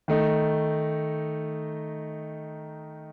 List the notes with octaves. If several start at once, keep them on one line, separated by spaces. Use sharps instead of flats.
D#3 A3 D#4